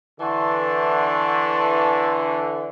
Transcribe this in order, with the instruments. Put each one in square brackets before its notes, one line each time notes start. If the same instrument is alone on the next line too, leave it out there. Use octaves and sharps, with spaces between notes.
[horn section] D3 E3 [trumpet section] A5 C6 C#6